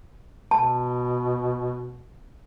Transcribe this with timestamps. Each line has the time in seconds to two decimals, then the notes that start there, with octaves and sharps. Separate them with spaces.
0.51 B2 A5